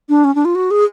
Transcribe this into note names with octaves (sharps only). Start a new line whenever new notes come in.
D4
C#4
D4
F4
F#4
G#4